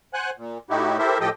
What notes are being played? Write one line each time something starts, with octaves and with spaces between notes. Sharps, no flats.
C5 F#5 G#5 F#6
A#2
A2 D#4 E4 F#4 G4
E4 G4 A4 A#4 C5 E5
A2 F3 G4 A4 D#5 G5